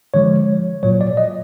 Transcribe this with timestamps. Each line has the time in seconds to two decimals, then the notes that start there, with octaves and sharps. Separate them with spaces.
0.14 D3 F3 G#3 C#5
0.83 A#2 F#3 C#5
1.01 D5
1.17 D#5